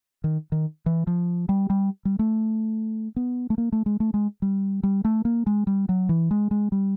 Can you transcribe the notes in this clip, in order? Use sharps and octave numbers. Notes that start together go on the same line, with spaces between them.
D#3
D#3
E3
F3
G3
G3
G3
A3
B3
A3
A#3
A3
G#3
A3
G#3
G3
G3
A3
A#3
G#3
G3
F#3
E3
G#3
G#3
G3